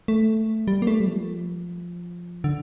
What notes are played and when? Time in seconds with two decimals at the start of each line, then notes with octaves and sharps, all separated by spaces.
0.08 A3
0.68 G3
0.82 A#3
0.87 A3
1.00 G3
1.07 F3
2.44 D3